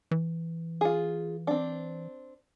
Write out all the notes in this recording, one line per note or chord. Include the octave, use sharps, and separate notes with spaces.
E3
F4 G#4
C4 D4